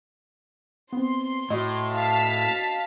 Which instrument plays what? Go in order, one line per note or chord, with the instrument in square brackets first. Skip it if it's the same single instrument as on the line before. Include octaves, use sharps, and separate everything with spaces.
[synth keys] B3 C4 [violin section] C6
[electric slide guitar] A2 [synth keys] F#4 D#5
[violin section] F5 A5 B6